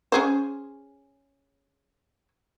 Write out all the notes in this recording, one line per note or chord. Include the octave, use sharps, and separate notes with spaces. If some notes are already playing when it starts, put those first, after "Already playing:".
C#4 G#4 C5